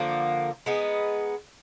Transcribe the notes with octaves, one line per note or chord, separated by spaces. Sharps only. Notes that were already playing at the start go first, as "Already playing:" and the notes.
Already playing: D3 F3 A#3
G#3 B3 D#4